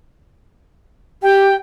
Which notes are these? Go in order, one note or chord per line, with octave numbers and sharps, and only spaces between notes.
G4 G5